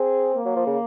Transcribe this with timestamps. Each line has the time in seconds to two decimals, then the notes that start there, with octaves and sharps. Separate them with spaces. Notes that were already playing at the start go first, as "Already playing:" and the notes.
Already playing: C4 G#4
0.35 A#3
0.45 F#3
0.56 F3
0.66 C#3